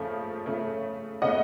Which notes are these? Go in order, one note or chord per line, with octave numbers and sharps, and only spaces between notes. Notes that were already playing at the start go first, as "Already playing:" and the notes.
Already playing: C#3 F3 A3 F5
C#3 A3
C#3 A3 D#5 F#5